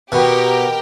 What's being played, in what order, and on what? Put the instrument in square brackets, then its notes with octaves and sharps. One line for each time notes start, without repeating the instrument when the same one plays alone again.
[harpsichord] B2 [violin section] G4 A#4 G5